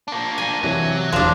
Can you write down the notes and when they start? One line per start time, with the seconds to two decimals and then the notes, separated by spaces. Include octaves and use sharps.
0.08 A#3 D4
0.38 G#5
0.63 C3 E3 F#3
1.13 E1 F3 D4